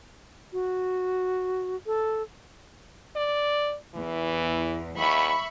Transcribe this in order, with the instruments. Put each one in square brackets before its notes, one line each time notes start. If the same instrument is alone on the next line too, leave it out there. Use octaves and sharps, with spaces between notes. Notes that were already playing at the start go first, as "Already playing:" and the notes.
[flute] F#4
A4
[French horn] D5
[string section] E2 [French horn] E3
[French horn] D#2 [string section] E5 B5 C#6